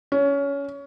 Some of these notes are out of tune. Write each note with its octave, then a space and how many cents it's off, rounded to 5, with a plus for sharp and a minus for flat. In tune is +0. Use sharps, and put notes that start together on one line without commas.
C#4 +20